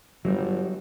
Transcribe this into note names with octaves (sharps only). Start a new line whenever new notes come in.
G1 F#3 G3